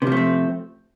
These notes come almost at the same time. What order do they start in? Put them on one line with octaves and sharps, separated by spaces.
C3 F3 A3 C4